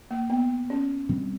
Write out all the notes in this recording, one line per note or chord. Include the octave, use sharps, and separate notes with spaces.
A#3
B3
C#4
B2 G3 C4